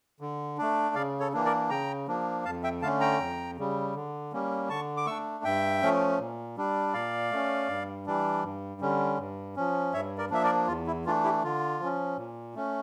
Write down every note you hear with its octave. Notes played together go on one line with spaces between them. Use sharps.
D3
A3 D4
C#3 D5 F5
A4 C#5
E3 A#3 D4
A#4 D5
C#3 G5 A#5
F3 A#3 D4
F2 F5 A5
E5 G5
D3 A3 C#4 F5 A5
G5 A#5
F2
C#3 G3
D3
G3 A#3 C#4
D3 A5 C#6
D6
A3 D4 C#6 E6
G2 E5 G5
F3 A3 C#4
A#2
G3 D4
A#2 D5 F5
A3 C#4
G2
E3 G3 D4
G2
D3 G3 C#4
G2
F3 C#4
G2 C#5 E5
A#4 D5
F3 A#3 D4 E5
A#4 D5
E2 F4
E4
E3 A3 D4 F4
E4 G4
D3 F4
F3 C#4
A#2
A3 C#4